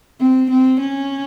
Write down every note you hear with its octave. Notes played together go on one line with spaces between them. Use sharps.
C4
C4
C#4